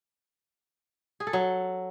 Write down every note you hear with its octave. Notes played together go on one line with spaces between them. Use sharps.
G#4
A4
F#3